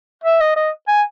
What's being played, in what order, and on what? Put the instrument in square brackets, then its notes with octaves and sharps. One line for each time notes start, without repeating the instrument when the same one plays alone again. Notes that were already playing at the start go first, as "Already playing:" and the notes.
[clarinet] E5
D#5
D#5
G#5